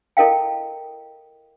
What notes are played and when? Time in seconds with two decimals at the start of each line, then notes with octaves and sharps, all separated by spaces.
0.17 E4 A4 A#4 D#5 F5 G5